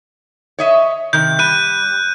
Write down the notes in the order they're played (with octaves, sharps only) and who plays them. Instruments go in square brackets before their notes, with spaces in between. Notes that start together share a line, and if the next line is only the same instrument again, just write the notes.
[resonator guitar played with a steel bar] C#5 D#5 E5
[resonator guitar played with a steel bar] C3 D#3 [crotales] G6
[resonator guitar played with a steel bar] G3 [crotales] F#6 D#7